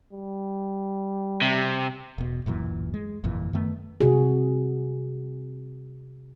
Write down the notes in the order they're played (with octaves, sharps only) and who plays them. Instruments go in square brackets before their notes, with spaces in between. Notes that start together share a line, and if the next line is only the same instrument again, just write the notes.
[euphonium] G3
[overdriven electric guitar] C3
[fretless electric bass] E1 B2
D1 F#2 A#2 E3
G#3
G1 F2 A#2 E3
F#2 D#3 A3 B3
[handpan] C3 F#4 G#4